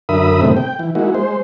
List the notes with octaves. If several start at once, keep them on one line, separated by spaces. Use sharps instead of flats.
F#2 D3 A#4 E5 B5 D#6
A2 C3 D#3 G3 A3 C4
G5
E3
G#3 A#3 D#4 E4 F#4
G#3 C5